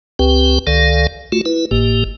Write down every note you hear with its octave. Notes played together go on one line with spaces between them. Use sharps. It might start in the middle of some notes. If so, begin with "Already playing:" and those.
C#2 C4 G4 B4 G5
C#2 D#3 A4 D5 F5
A3 F4 F#4
E4 B4
G#1 A2 A#3 G4